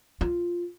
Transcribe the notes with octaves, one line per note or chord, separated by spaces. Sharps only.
F4